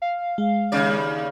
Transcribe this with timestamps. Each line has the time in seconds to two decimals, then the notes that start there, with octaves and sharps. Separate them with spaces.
0.02 F5
0.38 G#3
0.72 D#2 C#3 D5